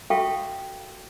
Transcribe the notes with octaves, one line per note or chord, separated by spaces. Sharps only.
F#4 A4 E5 F5 G5 C#6